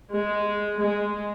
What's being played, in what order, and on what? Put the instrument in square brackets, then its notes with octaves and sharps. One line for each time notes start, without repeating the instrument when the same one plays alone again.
[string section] G#3
G#3